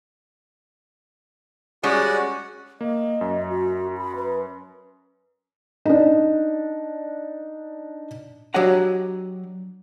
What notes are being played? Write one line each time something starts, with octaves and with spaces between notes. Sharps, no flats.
G3 G#3 C#4 F#4 D5 F#5
A#3 D#5
F#2
F#4
B5
B4
D4 D#4
F#3 D4 G4 C#5 D#5 F#5